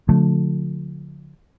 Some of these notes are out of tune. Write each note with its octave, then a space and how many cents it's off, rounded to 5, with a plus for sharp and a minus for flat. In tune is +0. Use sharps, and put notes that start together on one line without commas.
D3 -30 F3 +35 A3 -5